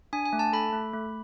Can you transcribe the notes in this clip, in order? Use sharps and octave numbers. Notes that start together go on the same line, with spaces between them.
D4 G#5
G#5
A3
A5
A4 B5
A3
A3